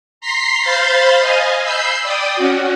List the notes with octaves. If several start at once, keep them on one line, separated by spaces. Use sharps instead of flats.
A#5 C6 B6 C7
C5 F5 B5 C6 G6 A6
D#5 F5 G#5
B5 E6 G6 C7
D5 G5 D#6
C#4 F#4